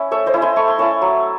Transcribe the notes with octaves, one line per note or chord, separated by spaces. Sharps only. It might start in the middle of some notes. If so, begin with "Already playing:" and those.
Already playing: C#4 E4
A3 C#5 E5
C5 D#5
C#4 E4
G#5 C6
A3 C#6
C6
C#4 E4 A5 C#6
F#3